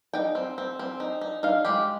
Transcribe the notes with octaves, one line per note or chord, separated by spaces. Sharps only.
D#4 G5
C4
C4
C4
D#4
D#4
D#4 F5
G#3 G4